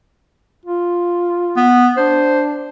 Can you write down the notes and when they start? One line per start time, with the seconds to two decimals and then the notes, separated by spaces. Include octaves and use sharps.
0.66 F4
1.57 B3
1.97 D4 C5